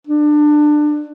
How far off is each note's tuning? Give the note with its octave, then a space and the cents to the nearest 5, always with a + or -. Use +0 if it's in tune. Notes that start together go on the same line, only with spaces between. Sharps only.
D4 +20